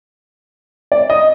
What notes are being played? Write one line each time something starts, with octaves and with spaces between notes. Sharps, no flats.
D5
D#5